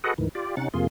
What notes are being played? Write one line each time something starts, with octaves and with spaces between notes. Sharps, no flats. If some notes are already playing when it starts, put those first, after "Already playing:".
F#4 G#4 A4 B4 D#5 F#5
D2 G#2 D#3 E3
F4 G4 D5
C3 C#4 D#4 F#5 A6
F2 C3 A#3 F4 G#4 C6